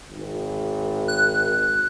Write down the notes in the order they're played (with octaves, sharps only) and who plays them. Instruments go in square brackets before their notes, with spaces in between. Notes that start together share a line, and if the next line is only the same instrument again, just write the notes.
[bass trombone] G#1
[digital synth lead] F#6